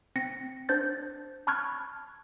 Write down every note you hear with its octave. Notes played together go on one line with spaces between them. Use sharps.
C4 A#6 C#7
D4 C5 G6 A6
A5 B5 C#6 F6 F#6 G#6